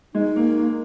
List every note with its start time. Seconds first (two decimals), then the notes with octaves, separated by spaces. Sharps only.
0.14 G#3 D#4
0.36 A#3
0.58 A#3